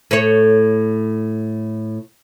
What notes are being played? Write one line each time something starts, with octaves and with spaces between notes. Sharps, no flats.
A2 C#5